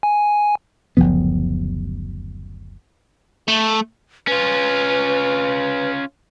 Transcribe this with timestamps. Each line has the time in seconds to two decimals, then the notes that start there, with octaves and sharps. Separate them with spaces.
0.03 G#5
0.97 F#1 D2 F3 B3
3.48 A3
4.27 C#4 F4 B4